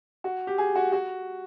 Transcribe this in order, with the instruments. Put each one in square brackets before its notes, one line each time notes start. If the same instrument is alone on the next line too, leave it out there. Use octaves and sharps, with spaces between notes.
[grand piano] F#4
G4
G#4
F#4
F#4